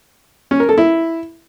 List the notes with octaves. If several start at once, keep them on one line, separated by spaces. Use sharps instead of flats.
C#4
A#4
A4
E4